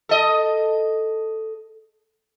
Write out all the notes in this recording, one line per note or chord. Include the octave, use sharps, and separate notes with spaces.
A4 D#5